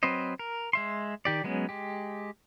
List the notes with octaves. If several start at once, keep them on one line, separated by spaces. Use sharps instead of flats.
F#3 C4 B4 C5 D#5
A#4
G#3 E5 C6
D#3 G4 D5
F#3 G#3 B3 C#4
G#3 G4